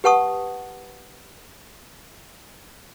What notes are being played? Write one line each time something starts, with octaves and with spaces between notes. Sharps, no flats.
G4 B4 F#5 A5 C#6 D#6